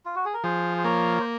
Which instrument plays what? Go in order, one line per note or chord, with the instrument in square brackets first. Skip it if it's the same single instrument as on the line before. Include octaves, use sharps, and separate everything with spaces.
[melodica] F4
F#4
G#4
A#4
[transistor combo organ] F3 [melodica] G#4 C5
[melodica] C5
[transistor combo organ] A#3 [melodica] A#4 C#5
[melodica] C5